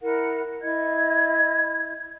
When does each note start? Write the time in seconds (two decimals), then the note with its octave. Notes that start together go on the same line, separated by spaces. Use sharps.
0.01 E4 A#4 F#5
0.62 E4 D#5 G#6